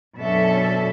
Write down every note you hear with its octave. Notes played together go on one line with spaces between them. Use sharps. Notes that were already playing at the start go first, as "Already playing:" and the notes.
F#2 B2 C#4 D4 A4 E5